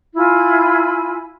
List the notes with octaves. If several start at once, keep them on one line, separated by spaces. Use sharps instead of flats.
E4 F4 G#5 B5